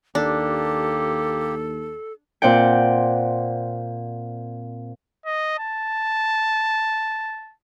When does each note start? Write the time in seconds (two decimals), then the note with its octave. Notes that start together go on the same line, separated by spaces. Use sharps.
0.15 D#2 A#3 D4 G4 A4
2.42 A#2 C4 D5 F#5 G5
5.26 D#5
5.59 A5